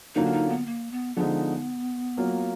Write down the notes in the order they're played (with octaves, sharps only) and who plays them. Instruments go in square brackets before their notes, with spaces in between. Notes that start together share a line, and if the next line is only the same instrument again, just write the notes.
[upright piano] D3 F#3 A#3 F4 [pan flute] D#4
[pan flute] D4
D#4
B3
A#3
B3
[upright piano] D3 F3 G#3 D#4 [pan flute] B3
[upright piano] F#3 A#3 F4